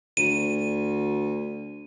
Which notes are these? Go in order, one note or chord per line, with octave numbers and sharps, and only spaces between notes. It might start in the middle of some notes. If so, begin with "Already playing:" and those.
D2 D#7